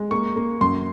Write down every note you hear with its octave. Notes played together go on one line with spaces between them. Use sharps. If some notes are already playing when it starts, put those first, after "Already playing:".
Already playing: G#3
A#3 C#6
A#3
F#2 C6